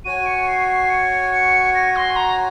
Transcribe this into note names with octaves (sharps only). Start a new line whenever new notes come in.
F#4 C#5 G#5 D#7
C#7
C7
C7
C#7
C#7
A#6
C6
A#5